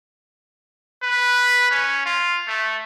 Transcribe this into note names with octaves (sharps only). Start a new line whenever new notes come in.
B4
C#4
F4
A3